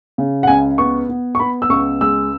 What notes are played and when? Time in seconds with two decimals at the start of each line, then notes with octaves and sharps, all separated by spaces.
0.18 C#3
0.43 F#5
0.47 C#2 G#5
0.78 B3 C#6
1.09 B3
1.35 C#6
1.39 B3 B5
1.62 E6
1.69 C#2 C#6
2.01 G#3 E6